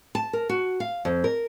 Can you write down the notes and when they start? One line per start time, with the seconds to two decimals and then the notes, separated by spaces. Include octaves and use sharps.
0.15 A5
0.33 A#4
0.49 F#4
0.80 F5
1.05 F2
1.24 A#4